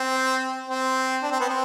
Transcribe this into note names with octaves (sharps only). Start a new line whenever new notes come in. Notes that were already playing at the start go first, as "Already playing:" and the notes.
Already playing: C4
C4
D4
C4
B3
C4